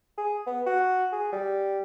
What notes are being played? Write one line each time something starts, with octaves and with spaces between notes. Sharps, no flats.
G#4
B3
F#4
G#4
G3